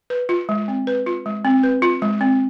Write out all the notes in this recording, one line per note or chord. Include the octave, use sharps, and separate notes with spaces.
B4
F4
G#3
C4
B4
F4
G#3
C4
B4
F4
G#3
C4